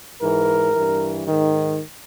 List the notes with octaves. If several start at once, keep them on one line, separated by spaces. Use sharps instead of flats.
G#2 E3 A#4
G2 E3
G#2 D#3